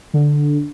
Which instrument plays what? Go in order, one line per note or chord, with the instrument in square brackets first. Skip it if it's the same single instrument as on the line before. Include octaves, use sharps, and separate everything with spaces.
[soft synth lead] D3